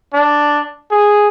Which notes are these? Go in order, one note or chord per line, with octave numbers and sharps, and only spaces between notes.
D4
G#4